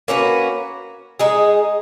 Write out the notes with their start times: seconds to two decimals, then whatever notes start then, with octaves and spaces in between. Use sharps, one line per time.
0.08 A#3 C#4 F#4 B4
1.20 G#3 D#4 G#4